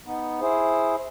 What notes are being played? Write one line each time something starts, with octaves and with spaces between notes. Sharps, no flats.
B3 D#4
E4 G#4 C5